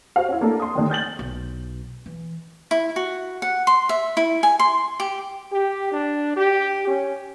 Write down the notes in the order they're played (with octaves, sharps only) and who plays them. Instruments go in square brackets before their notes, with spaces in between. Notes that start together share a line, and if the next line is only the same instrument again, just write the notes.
[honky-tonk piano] F#4 C5 F5
C#4 E4
A3 A#3 D4 E4 A4
C6 D#6
D#2 A2 D3 D#3
F6 G6 A6 F#7
[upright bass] B1
E3
[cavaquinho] E4
F#4
F#5
C6
E5
E4
G#5
C6
G4
[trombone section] G4
D4
G4
C#4